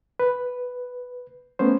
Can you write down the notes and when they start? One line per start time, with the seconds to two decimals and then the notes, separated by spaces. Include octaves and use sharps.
0.20 B4
1.59 A3 B3 C#4 C5